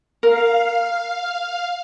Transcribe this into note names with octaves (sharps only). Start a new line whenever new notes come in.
A#4 F5